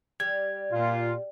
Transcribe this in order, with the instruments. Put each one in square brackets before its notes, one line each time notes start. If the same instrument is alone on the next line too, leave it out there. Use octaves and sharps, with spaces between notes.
[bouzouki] G3 [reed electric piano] G#6
[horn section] A#2 [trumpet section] F4